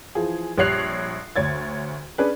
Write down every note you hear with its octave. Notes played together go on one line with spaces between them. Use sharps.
E3 F3 G#4
A#1 G3 C#5 F#6 C7 F7
D2 C#5 G#6 A6
C#4 D4 G#4 B4